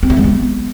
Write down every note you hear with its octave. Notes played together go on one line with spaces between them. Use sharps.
C4
E4
G#3
B3